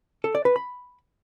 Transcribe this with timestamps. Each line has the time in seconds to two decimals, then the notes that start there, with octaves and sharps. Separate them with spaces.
0.24 A4
0.35 D5
0.45 B4
0.56 B5